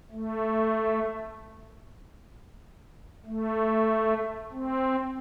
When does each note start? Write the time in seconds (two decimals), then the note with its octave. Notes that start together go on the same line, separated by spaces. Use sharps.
0.12 A3
3.26 A3
4.52 C4